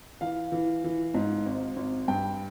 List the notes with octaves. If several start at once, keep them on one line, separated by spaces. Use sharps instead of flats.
E3 F5
E3
E3
G#2
G#1
G#1
G2 G5